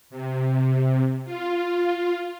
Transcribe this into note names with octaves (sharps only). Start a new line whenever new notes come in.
C3
F4